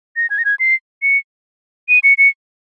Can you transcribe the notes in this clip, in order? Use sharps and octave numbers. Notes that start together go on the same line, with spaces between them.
A#6
G#6
A#6
G#6
C7
C#7
D#7
C#7
C#7